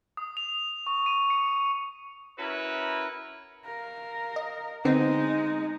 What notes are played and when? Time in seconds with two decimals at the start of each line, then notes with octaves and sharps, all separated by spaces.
0.17 D#6
0.37 F7
0.87 C#6
1.06 D#7
1.30 C#7
2.38 C#4 E4 F#4 A#4 B4
3.65 A#4 F5
4.36 D#5
4.85 D3 G#3 B3 C4 D#4